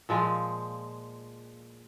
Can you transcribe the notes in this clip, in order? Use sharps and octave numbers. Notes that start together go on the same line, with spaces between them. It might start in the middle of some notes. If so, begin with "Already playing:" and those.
A#2 F3 G#3 F5